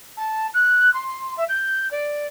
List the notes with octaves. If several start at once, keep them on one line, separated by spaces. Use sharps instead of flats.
A5
F#6
C6
E5
G6
D5